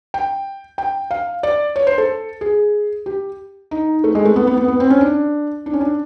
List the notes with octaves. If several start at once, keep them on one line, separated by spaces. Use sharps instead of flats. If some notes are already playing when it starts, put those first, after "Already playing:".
G5
G5
F5
D5
C#5
C5
A4
G#4
G4
D#4
A3
G#3
A3
B3
B3
B3
B3
C4
C#4
D4
D4
C#4
D4